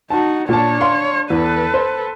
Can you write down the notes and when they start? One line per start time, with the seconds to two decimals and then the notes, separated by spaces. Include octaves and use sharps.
0.10 D#4 F#4 A5
0.49 A#2 D4 C#5 A5
0.81 F5 C6
1.30 E2 A4 B4
1.74 C5